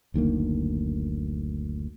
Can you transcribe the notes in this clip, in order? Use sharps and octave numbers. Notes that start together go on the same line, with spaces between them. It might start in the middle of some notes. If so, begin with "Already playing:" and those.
F#1 D2 D#3 A#3